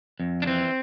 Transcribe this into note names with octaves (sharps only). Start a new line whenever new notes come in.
F2
D4
E3 C4